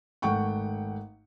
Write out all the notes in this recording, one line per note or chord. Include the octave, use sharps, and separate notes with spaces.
G#1 A3 F#5 G5 C#6